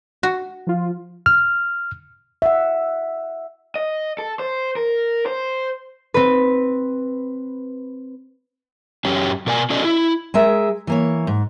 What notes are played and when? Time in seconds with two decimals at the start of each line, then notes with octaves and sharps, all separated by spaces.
0.23 F#4
0.67 F3 F4
1.26 F6
2.42 E5 F#5
3.75 D#5
4.19 A4
4.39 C5
4.76 A#4
5.26 C5
6.14 C4 B4
9.05 F#2 C#4 G4
9.47 B2 A#4 D5 G#5
9.70 C#4 F#4 A4 D5 D#5
9.84 E4
10.34 G#3 G#4 A#4 E5
10.87 E3 A#3 C#5
11.27 G#2